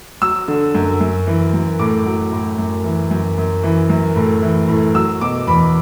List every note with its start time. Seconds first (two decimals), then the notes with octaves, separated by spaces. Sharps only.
0.22 F#3 E6
0.48 D3
0.74 F#2
1.01 F#2
1.27 E3
1.53 F#2
1.79 A2 D6
2.06 F#3
2.32 A2
2.58 F#2
2.84 E3
3.11 F#2
3.38 F#2
3.63 E3
3.89 F#2
4.16 A2
4.42 E3
4.68 A2
4.95 F#3 E6
5.21 B2 D6
5.47 E2 B5